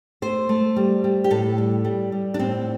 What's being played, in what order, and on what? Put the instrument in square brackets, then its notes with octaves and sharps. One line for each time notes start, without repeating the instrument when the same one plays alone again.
[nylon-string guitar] A3 C5
A3
G3
G3
G4
A2 A4
G3
G3
G3
D4
A2 C4